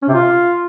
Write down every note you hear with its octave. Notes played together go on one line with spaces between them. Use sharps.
C#4
C3
F4